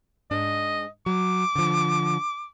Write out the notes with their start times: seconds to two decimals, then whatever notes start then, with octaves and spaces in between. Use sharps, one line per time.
0.31 G#2 D4 D#5
1.06 F#3 D6
1.56 D3 F3